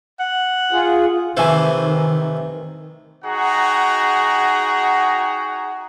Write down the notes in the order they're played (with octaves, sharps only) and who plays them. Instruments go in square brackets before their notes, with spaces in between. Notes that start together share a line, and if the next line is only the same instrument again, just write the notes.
[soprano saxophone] F#5
[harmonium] F4 G#4
[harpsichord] C3 E3 A3 [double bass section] D#3 [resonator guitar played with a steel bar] C5 G#5
[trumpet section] D#4 F#4 G#4 F#5 G5 A#5